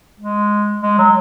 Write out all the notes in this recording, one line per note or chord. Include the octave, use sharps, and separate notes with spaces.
G#3
G#3
F#3